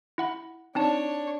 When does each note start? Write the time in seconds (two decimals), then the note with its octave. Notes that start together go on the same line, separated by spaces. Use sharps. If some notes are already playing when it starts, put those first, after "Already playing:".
0.18 E4 F#5 B5
0.75 C4 D4 D#4 C#5 A5